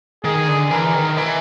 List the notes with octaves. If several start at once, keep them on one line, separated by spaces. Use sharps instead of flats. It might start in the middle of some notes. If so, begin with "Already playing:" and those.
D#3 G#4
D3
E3 A#4
D#3
E3